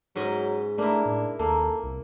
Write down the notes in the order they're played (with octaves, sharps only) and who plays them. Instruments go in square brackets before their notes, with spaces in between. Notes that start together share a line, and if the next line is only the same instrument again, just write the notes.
[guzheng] G#2 C#4 D#5 [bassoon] F#3
[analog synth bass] A3 [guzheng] A#3 E4 [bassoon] D4
[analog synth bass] A2
[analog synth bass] D#2 [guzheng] A#3 [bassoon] A4
[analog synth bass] C2